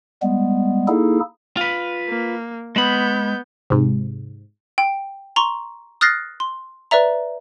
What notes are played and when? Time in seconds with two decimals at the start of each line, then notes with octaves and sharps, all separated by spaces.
0.22 G3 G#3 B3
0.88 A#3 D#4 E4 G#4 A4
1.57 F4 B4
2.09 A#3
2.76 G#3 B3 B5 G6
3.70 G#2 C3
4.78 G5
5.36 A#5 C6 C#6
6.01 D#6 F6 F#6 A6 A#6 C7
6.40 C6
6.91 B4 D5 E5 A#5